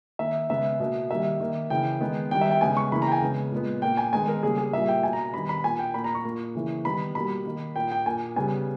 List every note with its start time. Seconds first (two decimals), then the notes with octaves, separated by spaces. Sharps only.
0.19 D#3 A#3 E5
0.50 C#3 G#3 B3 E5
0.80 B2 A#3
1.10 D#3 G3 A#3 E5
1.40 D#3 A#3
1.70 C#3 E3 A#3 G5
2.01 D#3 G#3 B3
2.31 D#3 G3 B3 G5
2.41 E5
2.51 G5
2.61 C#3 G#3 B3 G#5
2.77 C#6
2.92 C#3 E3 A#3 B5
3.02 A#5
3.08 G5
3.12 G#5
3.22 C#3 G#3 B3
3.52 A#2 G#3 B3
3.82 A#2 A#3 G5
3.97 G#5
4.13 D#3 G#3 B3 G#5
4.28 A#4
4.43 C#3 G3 A#3 G#4
4.58 G#4
4.73 A#2 G3 A#3 E5
4.88 G5
5.03 B2 A#3 G#5
5.13 A#5
5.34 D#3 G3 B3 B5
5.49 B5
5.64 A#2 A#3 G#5
5.79 G5
5.94 A#2 A#3 B5
6.04 A#5
6.15 C#6
6.25 A#2 A#3
6.55 C#3 E3 A#3
6.85 D#3 G3 B3 B5
7.15 B2 G3 A#3 B5
7.45 D#3 A#3
7.76 A#2 A#3 G5
7.91 G5
8.06 A#2 A#3 G#5
8.36 C#3 G3 B3 G#5